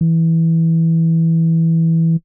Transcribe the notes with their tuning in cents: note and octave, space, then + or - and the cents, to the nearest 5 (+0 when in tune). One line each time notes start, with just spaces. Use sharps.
E3 -10